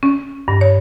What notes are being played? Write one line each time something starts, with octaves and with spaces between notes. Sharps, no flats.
C#4
G2
C#5